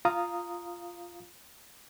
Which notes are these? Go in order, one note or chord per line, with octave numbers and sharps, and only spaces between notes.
F4 F5 A#5 D#6